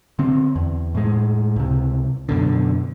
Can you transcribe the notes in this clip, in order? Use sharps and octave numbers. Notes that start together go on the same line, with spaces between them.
D3 C4
E2
A2 G#3
C#2 C3
F#2 B2 D3